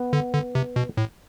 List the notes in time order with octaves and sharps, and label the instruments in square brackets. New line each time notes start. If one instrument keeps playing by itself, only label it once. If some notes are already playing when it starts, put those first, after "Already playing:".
Already playing: [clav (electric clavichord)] B3
[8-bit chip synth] D3
D3
C3
B2
A2